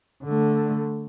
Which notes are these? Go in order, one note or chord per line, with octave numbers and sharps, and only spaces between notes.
D3 A3